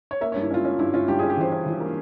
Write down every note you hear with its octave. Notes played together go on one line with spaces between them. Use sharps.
C#5
A#3 E5
C#5
G2
E4
C#4 F4
C#4
G2 E4
C#4 F4
G2 G4
G#4
C#4
G4
E3 C5
C#4
E3
A#3